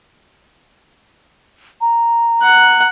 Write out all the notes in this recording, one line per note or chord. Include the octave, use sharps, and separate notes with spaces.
A#5
F#5